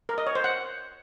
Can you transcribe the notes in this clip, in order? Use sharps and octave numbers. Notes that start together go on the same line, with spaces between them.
A#4
D#5
C#5
C5
F#5